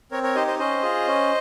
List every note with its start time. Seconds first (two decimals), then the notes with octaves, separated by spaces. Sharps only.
0.11 C4 A#4 C#5
0.23 A#4 C#5
0.35 D#4 G4 C5 D#5
0.47 C5 D#5
0.59 C#4 C5 D#5
0.83 F4 G#4
1.07 C#4